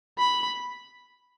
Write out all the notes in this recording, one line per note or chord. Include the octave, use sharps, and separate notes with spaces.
B5